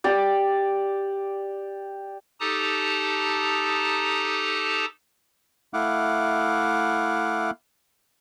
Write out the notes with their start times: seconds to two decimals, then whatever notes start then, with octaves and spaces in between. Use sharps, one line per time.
0.04 G4 D5
2.40 D#4 G4 A4 A5 A#5 D#6
5.74 A3 E4 F5 F#5 D6